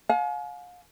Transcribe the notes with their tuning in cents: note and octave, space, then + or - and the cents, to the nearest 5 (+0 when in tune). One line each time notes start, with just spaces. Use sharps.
F5 +40 G#5 +40